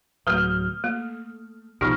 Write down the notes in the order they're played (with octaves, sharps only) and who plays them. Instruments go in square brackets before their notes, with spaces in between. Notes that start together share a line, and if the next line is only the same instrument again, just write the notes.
[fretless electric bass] D1 F#3 [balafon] A3 B4 [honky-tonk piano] D#6 F6 G6
[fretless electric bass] A3 [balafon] A#3
[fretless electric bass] C2 B2 F3 [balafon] D#4 G4 [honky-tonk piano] C#6 F6 A#6